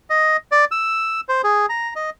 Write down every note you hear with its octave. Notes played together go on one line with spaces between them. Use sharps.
D#5
D5
E6
C5
G#4
A#5
D#5